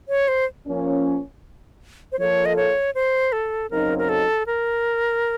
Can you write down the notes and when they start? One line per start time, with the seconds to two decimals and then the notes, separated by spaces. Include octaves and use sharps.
0.09 C#5
0.28 C5
0.67 F3 A#3 C#4
2.12 C5
2.18 F3 A#3 F4 A4 C#5
2.46 D#5
2.56 C#5
2.95 C5
3.32 A4
3.71 F#2 C#3 F#3 C4 D#4 A#4
3.98 A#4
4.09 A4
4.47 A#4